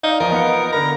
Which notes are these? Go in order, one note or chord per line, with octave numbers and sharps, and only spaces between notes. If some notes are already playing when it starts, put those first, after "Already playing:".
D#4 D5 F5 G6
E2 F3 A#4 D#5
B3 F5 C#7
D3 A#4 A#5 B5